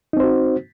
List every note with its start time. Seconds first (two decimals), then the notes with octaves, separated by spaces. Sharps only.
0.13 D#4
0.17 C4
0.20 C5
0.23 F#4